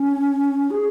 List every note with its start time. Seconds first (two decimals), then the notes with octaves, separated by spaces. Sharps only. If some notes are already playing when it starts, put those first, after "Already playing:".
Already playing: C#4
0.71 G#4